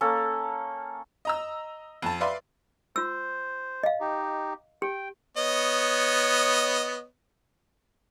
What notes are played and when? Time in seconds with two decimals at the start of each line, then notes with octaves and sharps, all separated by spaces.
0.01 A#3 C#4 A4
1.25 D#5 A#5 E6
2.02 F2 A5
2.20 B4 D5 E5 F5 C6
2.96 F4 C5 E6
3.83 D#5 F5
4.00 D#4 G4
4.82 G4 G5
5.37 B3 C#5 D#5